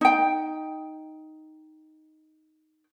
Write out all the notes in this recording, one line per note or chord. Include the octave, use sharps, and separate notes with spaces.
D#4 G5